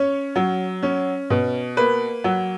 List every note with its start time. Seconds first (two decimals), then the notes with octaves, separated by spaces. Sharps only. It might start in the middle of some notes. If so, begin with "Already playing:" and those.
Already playing: C#4 C#5
0.36 F#3
0.83 C#4
1.30 B2
1.77 A#3 B4
2.24 F#3